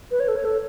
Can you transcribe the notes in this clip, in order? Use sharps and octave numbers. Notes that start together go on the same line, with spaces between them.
B4
C#5
A4
C#5
A4